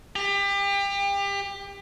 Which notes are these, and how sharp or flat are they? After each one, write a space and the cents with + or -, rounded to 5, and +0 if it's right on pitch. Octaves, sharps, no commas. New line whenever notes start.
G4 +30